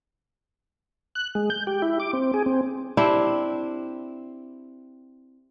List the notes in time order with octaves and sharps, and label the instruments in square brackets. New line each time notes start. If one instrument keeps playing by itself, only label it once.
[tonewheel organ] F#6
G#3
G6
G4
E4
D6
C4
G#4
C4
[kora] C4 D4 E4 G4